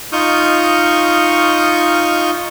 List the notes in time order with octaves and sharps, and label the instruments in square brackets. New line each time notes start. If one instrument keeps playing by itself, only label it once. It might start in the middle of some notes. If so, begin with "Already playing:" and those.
[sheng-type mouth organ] D#4 F4 C#6 D#6 F6 G6